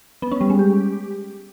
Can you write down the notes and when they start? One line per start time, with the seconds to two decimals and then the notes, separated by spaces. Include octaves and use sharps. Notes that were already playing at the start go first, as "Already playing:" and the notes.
0.22 B3
0.32 C#4
0.41 G3
0.50 G#3
0.59 G4